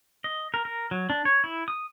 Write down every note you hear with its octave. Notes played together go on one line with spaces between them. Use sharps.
D#5
A#4
A#4
F#3
D4
C#5
E4
D#6